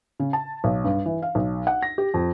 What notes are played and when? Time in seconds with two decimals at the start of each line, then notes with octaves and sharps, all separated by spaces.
0.20 C#3
0.33 A5
0.64 B1
0.85 G2
1.06 E3
1.22 F5
1.35 B1
1.67 F#5
1.83 A#6
1.98 G4
2.14 F2